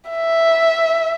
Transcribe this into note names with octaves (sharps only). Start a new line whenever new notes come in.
E5